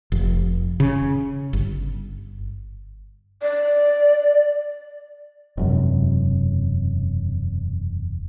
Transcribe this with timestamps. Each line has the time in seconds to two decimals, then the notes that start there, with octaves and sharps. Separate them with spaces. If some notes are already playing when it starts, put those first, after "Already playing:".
0.12 F1
0.80 C#3
1.53 G1
3.42 D5
5.57 E1 F#2 C3